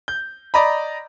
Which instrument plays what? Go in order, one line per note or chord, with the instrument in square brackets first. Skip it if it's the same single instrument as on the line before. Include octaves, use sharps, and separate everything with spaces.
[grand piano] G6
D5 D#5 A#5 B5